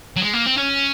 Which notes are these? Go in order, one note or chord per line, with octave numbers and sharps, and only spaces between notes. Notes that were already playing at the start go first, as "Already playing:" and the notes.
F#3
G#3
A#3
C4
C#4